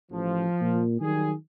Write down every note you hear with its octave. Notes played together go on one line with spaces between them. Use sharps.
A1 F3
A#2
D#3 F#3 G3 G#4